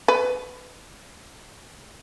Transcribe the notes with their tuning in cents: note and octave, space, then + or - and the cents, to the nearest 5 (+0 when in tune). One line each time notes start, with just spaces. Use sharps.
B4 +20